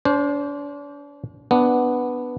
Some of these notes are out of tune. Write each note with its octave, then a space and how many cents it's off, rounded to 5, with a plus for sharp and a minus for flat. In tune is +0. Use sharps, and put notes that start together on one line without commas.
D4 -40 C5 +5
B3 +0 D4 +0